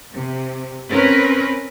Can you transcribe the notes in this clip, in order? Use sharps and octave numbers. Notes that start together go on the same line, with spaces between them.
C3
C4 C#4 A#4 B4